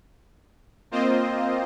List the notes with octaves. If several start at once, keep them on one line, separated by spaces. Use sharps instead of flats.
A#3 C4 F4 C5 D#5